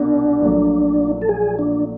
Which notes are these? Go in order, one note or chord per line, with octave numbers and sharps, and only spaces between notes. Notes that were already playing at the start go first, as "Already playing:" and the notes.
Already playing: C2 B2 D4
A#1 A#2 F#3 A3
A4
G#4
D4